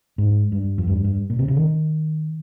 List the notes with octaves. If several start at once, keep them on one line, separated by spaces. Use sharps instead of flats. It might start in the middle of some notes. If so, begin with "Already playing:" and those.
G#2
G2
F2
G2
G2
A#2
C3
C#3
D#3